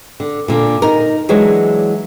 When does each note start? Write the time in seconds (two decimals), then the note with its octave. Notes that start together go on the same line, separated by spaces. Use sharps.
0.20 D3
0.48 A#2 D3
0.82 D#4 A#4
1.29 E3 F#3 G#3 D4 E4 C#5